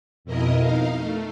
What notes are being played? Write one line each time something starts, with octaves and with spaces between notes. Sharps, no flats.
F2 B2 E4 A#4 D#5
D#4 F5
A3